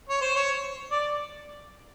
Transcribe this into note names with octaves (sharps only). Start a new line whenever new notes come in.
C#5
C5
C#5
D5